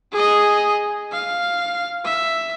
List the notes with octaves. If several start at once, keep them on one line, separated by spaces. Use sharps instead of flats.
G#4 D#5
F5
E5